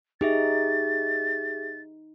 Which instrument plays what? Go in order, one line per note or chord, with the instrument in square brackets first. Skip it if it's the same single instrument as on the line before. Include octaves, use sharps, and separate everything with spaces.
[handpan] D#4 [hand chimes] G4 G#4 E5 [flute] A6